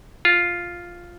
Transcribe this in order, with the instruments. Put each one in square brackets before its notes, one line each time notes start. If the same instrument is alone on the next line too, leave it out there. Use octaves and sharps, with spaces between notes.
[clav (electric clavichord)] F4